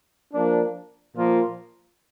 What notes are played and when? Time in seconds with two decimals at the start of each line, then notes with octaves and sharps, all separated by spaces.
0.34 F3 A#3 D4
1.14 A#2 F3 A#3 F4